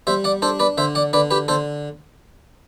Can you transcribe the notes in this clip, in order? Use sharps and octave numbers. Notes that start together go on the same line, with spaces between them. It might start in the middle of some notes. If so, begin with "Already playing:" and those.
G3 C5 E5
D5 F#5
D4 A4 C5
B4 D5
D3 C5 E5
D5 F#5
D3 B4 D5
G4 B4
D3 A4 C5